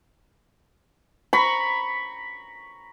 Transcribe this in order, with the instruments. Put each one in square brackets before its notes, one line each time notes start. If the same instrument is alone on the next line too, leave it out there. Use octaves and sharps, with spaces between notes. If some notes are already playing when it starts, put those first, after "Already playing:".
[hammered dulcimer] A#5 B5 C#6